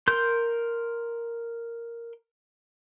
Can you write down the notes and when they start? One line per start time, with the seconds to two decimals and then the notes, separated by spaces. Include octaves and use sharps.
0.08 A#4 C6 G6